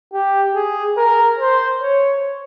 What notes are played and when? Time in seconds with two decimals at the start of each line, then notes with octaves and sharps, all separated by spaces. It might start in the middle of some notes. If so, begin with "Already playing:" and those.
0.13 G4
0.55 G#4
0.97 A#4
1.39 C5
1.82 C#5